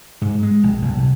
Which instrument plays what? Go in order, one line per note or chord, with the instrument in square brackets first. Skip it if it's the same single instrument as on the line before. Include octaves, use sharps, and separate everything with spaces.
[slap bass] G#2
G#3
A#1
A#1
C2